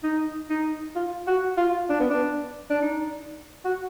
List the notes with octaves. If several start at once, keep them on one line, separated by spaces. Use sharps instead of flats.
D#4
D#4
F4
F#4
F4
D4
B3
D4
D4
D#4
F#4